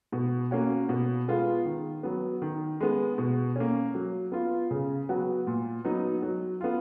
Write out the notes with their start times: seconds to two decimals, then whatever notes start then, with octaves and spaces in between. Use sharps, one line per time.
0.12 B2
0.51 A#3 C#4 F#4
0.89 B2
1.28 G#3 B3 F4
1.65 D#3
2.03 F#3 B3
2.42 D#3
2.80 G#3 B3
3.18 B2
3.56 A#3 C#4
3.95 F#3
4.32 B3 F4
4.71 C#3
5.09 F#3 B3 F#4
5.47 A#2
5.85 F#3 B3 D#4
6.22 F#3
6.61 B3 F4